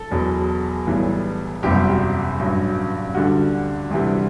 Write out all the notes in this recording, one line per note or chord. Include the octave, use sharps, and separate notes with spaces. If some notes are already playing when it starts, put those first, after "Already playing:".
Already playing: A4
E1 E2 B2 F#3
B1 A2 E3 G3
F#1 E2 C3 G3 G4
F#4
G4
A1 G2 F#3
D2 D3 G3 F#4
D2 C3 E3 G3